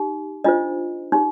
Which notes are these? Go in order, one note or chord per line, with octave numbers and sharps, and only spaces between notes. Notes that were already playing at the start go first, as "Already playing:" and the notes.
Already playing: D#4 G4
D4 F4 C5 D#5
D#4 G4